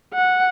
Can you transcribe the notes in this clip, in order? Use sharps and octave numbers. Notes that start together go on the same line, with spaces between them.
F#5